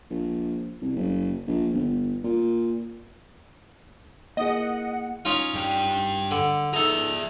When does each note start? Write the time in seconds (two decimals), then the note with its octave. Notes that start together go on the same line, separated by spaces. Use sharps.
0.11 A#1
0.82 C2
0.96 F#1
1.47 A#1
1.74 G1
2.24 A#2
4.37 A#3 E4 G#4 D#5 F#5
5.25 C#4 D#4 F4
5.54 G2 G4
6.31 D3
6.73 D#4 G#4 A4 E5 A#5